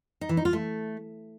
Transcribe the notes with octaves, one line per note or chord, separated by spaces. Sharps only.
D#4
E3
D#4
F4
A3